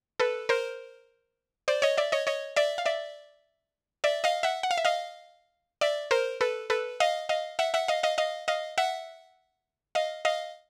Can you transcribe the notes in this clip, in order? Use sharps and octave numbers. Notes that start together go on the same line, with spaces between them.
A4 B4
A#4 C5
C5 D5
C#5 D#5
D5 E5
C#5 D#5
C#5 D#5
D5 E5
F5
D5 E5
D5 E5
D#5 F5
E5 F#5
F#5
F5
E5
D#5 F5
D5 E5
A#4 C5
A4 B4
A4 B4
D#5 F5
D#5 F5
E5 F#5
E5 F#5
D#5 F5
D#5 F5
D#5 F5
D#5 F5
E5 F#5
D#5 F5
D#5 F5